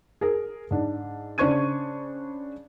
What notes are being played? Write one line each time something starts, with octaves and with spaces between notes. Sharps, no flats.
G#4 A#4
G#2 D4
C#3 D4 C5 C#6 G#6 D#7